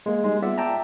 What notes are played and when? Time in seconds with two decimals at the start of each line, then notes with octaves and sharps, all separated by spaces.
0.06 G#3 A#3
0.24 G3 G#3 D#4
0.42 B3 F4 D5 E5 F#5
0.58 D5 E5 G5 A5 A#5